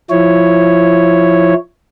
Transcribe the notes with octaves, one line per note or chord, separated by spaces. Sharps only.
F3 E4 C#5